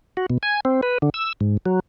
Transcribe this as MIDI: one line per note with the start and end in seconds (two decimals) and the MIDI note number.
0.17 0.26 66
0.30 0.38 47
0.43 0.60 80
0.65 0.81 60
0.83 0.98 71
1.02 1.10 50
1.14 1.33 88
1.41 1.57 44
1.66 1.80 54